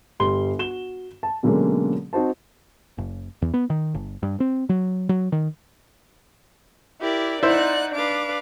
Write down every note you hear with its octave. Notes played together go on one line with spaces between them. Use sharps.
G1 G3 C6 G7
F#4 E7 G7
A5
B2 D3 F#3 G#3 A#3 C#4
C4 D#4 F#4 C5 A5
F#1
E2
B3
D#3
G1
G2
C4
F#3
F#3
D#3
E4 G4 A#4 D5
D#4 E4 C5 D5 F#5 F#6
D4 B4 F5 D6